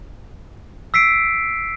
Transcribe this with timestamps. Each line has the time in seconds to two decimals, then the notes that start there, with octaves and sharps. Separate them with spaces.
0.94 E6 B6 C7 D7